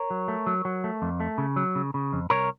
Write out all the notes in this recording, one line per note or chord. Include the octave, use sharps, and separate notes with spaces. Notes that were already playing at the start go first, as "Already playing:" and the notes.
Already playing: A#4 C#5
F#3
A3
F#3
F#3
A3
F2
A3
C#3
F#3
C#3
C#3
F2
C2 A#4 C#5